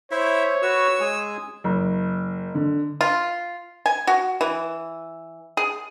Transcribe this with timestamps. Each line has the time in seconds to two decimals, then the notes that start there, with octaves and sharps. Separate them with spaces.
0.11 E4 C5 C#5 E5
0.62 F#4 B4 C#6 E6
1.01 G#3 G#4 G#5
1.64 F#1
2.55 D3
3.01 F4
3.86 G#5
4.07 F#4
4.41 E3
5.57 G#4